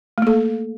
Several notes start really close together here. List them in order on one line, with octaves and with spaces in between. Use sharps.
A3 A#3 A4